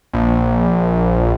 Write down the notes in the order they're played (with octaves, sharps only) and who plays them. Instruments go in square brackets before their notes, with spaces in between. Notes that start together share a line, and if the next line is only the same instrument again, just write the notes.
[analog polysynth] A#1